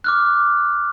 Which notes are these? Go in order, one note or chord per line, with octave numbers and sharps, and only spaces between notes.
D6 F6 F#6